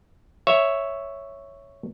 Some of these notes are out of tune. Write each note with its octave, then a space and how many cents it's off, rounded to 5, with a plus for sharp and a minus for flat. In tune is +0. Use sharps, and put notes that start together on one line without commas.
C#5 +0 E5 +0